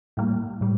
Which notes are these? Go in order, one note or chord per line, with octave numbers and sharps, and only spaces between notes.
A2 G3 A#3
A2 G3